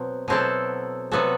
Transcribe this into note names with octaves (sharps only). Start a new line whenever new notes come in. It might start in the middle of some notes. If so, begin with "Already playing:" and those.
Already playing: B2 F#3 C4
B2 F#3 C4 E4 A4
C3 F#3 B3 F#4 A4